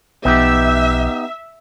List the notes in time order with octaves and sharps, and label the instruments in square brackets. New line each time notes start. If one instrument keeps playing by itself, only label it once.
[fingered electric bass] B1 F3 [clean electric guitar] B3 D#4 G4 [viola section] E5